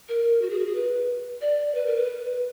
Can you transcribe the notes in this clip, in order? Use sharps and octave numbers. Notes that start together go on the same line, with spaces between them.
A#4
F#4
G#4
F#4
G#4
B4
D5
B4
A#4
B4